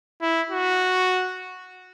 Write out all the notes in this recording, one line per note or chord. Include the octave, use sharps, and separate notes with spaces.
E4
F#4